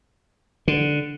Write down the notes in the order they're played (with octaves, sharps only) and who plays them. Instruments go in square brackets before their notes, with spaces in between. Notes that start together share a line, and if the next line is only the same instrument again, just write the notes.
[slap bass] D3